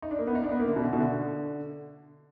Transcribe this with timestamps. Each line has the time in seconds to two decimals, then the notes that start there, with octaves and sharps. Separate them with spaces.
0.02 D#4
0.11 D4
0.19 A#3
0.27 B3
0.35 D#4
0.44 D4
0.52 B3
0.60 A#3
0.68 D3
0.76 B2
0.84 D3
0.93 B2
1.00 D3